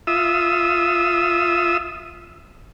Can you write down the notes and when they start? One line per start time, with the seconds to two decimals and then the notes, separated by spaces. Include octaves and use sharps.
0.07 F4 E5 D#6 E6